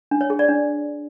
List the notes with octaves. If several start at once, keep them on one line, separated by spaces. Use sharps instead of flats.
D4
C#5
G#4
D5
D4